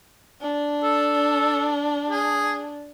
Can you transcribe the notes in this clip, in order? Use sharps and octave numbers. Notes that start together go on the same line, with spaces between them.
D4
A4
G#4